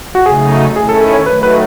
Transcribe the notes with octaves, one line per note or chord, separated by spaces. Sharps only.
F#4
C#3 F#3 A3 D#4 G#4
D#3 A3 C#4 E4 G#4
A4
A4
C#5
D#3 F#3 A3 B4
B4